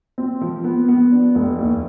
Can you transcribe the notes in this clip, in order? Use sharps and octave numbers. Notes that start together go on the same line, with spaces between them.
C4
F3
B3
B3
D4
F1
D#2